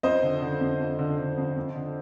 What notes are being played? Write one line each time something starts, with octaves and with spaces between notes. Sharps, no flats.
F2 C5 D#5
D3
D3
F2
F2
D3
D3
F2
F2
D3